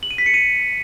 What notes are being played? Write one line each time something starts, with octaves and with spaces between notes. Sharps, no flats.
F#7
D#7
B6
C#7
D#7